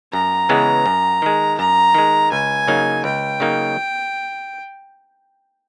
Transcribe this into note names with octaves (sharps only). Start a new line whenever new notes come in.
F#2 A#5
C#3 E3 G#3 B3
F#2
D#3 G#3
F#2 A#5
D#3 G#3
C#2 G#5
C#3 F#3 A#3 D#4
C#2 G5
C#3 F#3 A#3 D#4